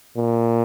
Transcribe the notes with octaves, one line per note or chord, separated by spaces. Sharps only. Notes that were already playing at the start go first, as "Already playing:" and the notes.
A#2